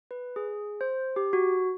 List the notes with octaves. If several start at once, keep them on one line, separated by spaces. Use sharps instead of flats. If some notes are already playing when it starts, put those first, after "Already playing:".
B4
G#4
C5
G4
F#4